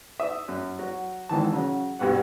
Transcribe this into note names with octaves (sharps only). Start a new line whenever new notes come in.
E5 D#6
F#2
F#3
G#1 D#3 E3 A5
C#3 F#3
C2 G2 B2 B4 F#5